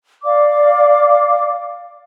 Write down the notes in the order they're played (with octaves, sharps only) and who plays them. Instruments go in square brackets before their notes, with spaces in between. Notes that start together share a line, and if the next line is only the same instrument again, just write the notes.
[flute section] D5 F5 D6